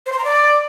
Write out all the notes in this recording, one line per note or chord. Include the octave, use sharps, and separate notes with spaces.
C5
C6
A#5
D5